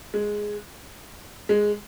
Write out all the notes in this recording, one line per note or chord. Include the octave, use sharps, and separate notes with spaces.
G#3
G#3